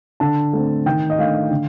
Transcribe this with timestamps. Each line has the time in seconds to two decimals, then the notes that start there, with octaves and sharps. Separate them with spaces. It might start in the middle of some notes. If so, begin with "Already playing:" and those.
0.20 D3 A5
0.53 A3 C4
0.86 D#3 G5
1.10 D#5
1.18 A3 D4 F5
1.51 D3